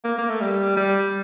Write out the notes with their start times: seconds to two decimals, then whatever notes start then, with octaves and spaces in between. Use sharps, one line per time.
0.05 A#3
0.18 A#3
0.30 A3
0.41 G3
0.77 G3